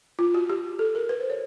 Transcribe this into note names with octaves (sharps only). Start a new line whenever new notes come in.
F4
F#4
G4
A4
A#4
B4
C5
C#5